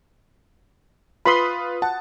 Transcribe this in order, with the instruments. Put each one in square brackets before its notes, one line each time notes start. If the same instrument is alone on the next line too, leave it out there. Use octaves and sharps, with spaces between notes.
[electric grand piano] F4 B4 D#6 [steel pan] B5 C6
[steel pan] F#5 [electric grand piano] A5